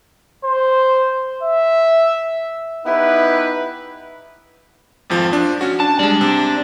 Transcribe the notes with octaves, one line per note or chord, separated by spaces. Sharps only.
C5
E5
B3 D#4 E4 G4 B4
G#1 F2 F3
F3 D4
C#4 F#4
D4 A5
G3 G#3 D4
C3